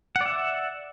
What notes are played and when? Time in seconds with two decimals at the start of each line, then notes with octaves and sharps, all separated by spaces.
0.16 F#5
0.21 D5
0.26 E5